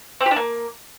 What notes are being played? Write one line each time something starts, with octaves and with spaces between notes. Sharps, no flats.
C4
G4
D4
A#3